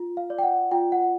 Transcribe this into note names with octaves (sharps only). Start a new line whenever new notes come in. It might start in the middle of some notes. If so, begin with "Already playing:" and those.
Already playing: F4
F5
D5
G5
F#5
F4 G5
F#5